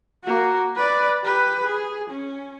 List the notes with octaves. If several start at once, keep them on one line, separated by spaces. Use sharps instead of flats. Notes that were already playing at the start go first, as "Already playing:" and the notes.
A#3 F#4
B4 D5
G4 B4
G#4
C#4